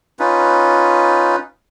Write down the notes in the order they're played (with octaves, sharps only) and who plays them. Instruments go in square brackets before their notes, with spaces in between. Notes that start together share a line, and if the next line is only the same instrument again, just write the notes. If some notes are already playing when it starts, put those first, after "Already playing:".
[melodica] C#4 D#4 F4 B4